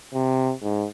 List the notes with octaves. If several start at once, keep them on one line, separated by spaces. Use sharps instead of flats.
C3
G#2